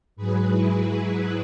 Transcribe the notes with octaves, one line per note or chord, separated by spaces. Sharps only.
G#2 F#3 G#4 B4
E4 G#4